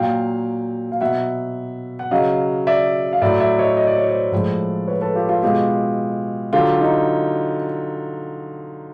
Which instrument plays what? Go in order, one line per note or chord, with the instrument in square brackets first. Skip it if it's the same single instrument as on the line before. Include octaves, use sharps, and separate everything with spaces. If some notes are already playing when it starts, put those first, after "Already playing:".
Already playing: [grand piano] A#2 F#3 F5 G5
F5
B2 F#3 E5 F#5
F#5
C#3 F#3 D#5 F5
D5 E5
F5
A2 F#3 D5 E5
D5 E5
C#5 D#5
D#5
D5
C#5
C5 D5
A2 F3 G#3
B4 C#5
A4 B4
F4 G4
F4 G4
B2 G#3 F4 G4
D3 F#3 F4 G4
D#4